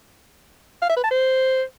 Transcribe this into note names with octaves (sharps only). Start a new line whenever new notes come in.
F5
E5
B4
A5
C5